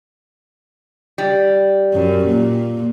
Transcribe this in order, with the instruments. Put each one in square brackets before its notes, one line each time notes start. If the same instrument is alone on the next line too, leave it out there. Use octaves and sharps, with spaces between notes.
[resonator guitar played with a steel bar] G3
[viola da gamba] F#2
A#2